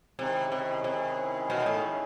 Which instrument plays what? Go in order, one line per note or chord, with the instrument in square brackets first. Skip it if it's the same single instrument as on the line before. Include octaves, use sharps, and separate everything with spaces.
[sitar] C3 [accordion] D#3 G#3 C#4 E4 G#4
[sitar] C3
C3
B2
A2